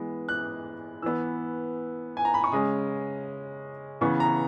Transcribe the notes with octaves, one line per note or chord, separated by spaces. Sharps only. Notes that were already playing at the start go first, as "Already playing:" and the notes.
Already playing: E3 G#3 B3
F#6
E3 B3 E6
G#5
A#5
B5
C#6
C#3 G#3 C#4 D#6
C#3 E3 B3 C#6
A#5